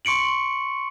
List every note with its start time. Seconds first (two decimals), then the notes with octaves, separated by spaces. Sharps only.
0.05 C6 C#6 C#7 D7 F#7